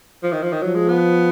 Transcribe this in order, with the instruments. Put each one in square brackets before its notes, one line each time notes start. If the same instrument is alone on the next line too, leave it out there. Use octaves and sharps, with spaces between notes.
[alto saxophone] F3
D#3
F3
D#3
[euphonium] F3 [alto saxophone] F#3
[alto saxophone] G#3
B3